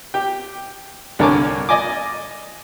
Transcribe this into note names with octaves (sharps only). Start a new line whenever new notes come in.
G4 G5
C2 D3 A#4 C#5 G#5 D6
D5 D#5 G#5 D6